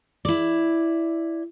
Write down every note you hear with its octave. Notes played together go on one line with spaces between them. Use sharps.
E4 D5